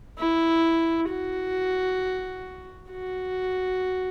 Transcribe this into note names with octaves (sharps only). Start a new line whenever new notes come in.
E4
F#4
F#4